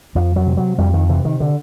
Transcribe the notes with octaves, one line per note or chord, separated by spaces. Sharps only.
F2 F3
F#3
C3
F#3
F2 G3
D#3
C3 E3
D#3
D3